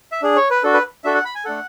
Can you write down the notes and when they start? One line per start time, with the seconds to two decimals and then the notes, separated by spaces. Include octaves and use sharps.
0.12 E5
0.22 D4 G#4
0.36 C#5
0.50 B4
0.63 D4 F#4 A4
0.74 B4
1.04 D4 F#4 A4 E5
1.15 F#5
1.25 B5
1.35 G#5
1.45 A3 D4 A4 F#5